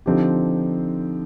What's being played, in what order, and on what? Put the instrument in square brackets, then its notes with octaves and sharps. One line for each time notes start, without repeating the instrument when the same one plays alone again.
[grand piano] D3 F3 C4 D#4 G4